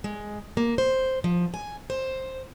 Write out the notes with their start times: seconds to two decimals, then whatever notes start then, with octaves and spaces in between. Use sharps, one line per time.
0.04 G#3
0.57 A#3
0.78 C5
1.24 F3
1.54 G#5
1.90 C5